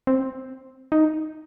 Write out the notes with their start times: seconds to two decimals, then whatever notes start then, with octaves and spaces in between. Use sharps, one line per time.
0.07 C4
0.92 D#4